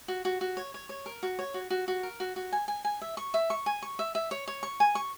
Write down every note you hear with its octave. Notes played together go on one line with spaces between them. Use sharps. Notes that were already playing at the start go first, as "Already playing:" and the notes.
F#4
F#4
F#4
C#5
C#5
C#5
A#4
F#4
C#5
F#4
F#4
F#4
A#4
F#4
F#4
G#5
G#5
G#5
E5
C#6
E5
C#6
G#5
C#6
E5
E5
C#5
C#5
C#6
G#5
C#6